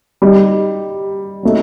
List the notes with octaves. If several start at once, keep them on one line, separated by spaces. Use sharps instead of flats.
G3 D#4 G4
F#3 A3 D#4